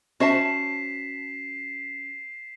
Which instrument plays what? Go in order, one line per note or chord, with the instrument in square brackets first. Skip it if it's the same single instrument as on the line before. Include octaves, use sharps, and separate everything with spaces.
[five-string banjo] C#4 C5 E5 [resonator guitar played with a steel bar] F#4 A5 [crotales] B6 C7 E7